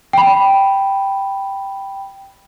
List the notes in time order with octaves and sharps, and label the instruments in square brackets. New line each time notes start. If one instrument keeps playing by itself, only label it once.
[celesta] G5 B5